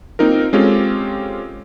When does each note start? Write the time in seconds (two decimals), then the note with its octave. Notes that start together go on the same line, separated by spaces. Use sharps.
0.19 A#3 C4 D#4 F4 A#4
0.53 G#3 C4 C#4 F4 G4 A4